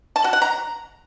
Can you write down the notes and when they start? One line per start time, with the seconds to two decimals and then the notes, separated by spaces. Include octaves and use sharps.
0.16 A5
0.24 F#4
0.33 F#5
0.42 A#5